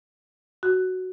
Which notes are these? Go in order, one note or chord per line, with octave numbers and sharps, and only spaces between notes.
F#4